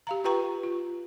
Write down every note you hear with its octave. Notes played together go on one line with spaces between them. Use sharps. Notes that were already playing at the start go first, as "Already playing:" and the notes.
G4 F5 A#5
F4 G4 B4 G5 A#5 C#6
F4